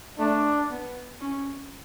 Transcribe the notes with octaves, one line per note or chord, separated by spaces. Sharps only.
A3 D4
B3
C#4